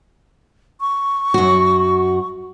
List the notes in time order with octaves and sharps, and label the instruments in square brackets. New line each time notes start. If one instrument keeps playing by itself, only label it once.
[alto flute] C#6
[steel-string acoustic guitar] F#2 F#4